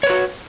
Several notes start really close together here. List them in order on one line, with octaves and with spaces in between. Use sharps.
C#5 B4 F#4